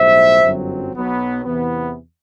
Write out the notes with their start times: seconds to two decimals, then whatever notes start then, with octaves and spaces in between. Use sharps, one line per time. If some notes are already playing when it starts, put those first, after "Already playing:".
Already playing: B1 A2 G3 C5 E5
0.41 G1 F#2 F#3 C4
0.93 B1 B2 F#3 B3
1.44 E2 C3 E3 B3